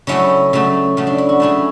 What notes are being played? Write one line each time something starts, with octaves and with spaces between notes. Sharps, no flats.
C#3 F#3 A3 C#4 E4
C#3 F#3 A3
C#3 F#3 A3
D4
E4
F#4
C#3 F#3 A3 E4 G#4